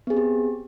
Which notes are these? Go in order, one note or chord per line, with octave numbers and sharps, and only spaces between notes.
B3 C4 G4 G#4